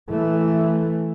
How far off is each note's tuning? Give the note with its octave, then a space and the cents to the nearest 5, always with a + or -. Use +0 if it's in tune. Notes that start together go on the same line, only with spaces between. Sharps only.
E3 +0 A3 +0